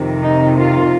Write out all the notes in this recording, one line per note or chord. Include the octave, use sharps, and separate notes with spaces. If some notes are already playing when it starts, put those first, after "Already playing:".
Already playing: F2 C3 D#3
D#4
F4